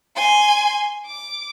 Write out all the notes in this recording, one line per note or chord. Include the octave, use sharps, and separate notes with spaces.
G#5 C6
D6